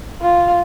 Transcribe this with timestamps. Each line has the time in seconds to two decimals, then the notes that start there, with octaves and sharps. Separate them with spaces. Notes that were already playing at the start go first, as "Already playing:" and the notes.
0.21 F4